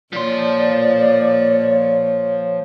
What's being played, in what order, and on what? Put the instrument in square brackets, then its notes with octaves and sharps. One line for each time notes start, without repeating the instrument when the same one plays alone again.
[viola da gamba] A#2 [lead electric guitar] F3 C6 [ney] C#5 [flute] D5